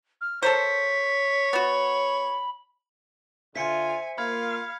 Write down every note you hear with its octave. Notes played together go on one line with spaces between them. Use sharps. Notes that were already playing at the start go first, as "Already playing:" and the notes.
F6
A4 A#4 C5 C#5 B6
B3 F#4 B5
D3 F4 C5 E5 G#5 B6 C#7
A#3 F4 F5 B5 F6 G#6